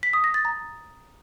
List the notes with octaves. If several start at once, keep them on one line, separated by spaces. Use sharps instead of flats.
B6
D#6
A#6
A6
A#5